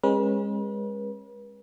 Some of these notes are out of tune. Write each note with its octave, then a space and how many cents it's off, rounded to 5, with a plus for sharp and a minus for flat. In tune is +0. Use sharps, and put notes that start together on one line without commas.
G#3 -25 C#4 -40 B4 -40